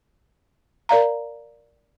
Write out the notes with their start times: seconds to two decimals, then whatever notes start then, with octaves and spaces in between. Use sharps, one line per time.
0.89 A#4 D5 F5 A#5